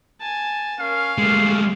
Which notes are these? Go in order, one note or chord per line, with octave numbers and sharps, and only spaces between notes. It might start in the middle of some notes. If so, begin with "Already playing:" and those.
G#5 A5
C#4 A#4 F5
G#3 A3 C#4 G4